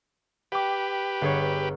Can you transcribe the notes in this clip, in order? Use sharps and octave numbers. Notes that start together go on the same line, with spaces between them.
G4 B4 G5 D6
G1 G#4 C#5